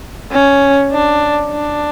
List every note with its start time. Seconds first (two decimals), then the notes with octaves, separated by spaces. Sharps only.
0.32 C#4
0.92 D4
1.51 D4